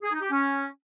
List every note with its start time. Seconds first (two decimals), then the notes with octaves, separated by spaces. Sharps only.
0.03 G#4
0.12 D#4
0.21 G4
0.30 C#4